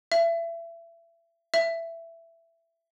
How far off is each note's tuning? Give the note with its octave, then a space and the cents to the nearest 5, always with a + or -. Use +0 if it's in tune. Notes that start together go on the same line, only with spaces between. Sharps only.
E5 +30
E5 +15